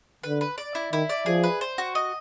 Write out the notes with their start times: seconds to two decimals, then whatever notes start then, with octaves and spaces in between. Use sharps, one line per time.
0.23 D3 B4
0.41 B4
0.58 D5
0.75 E4
0.93 D#3 E4
1.09 D5
1.26 F3 G#4
1.44 B4
1.61 C5
1.78 F#4
1.95 D#5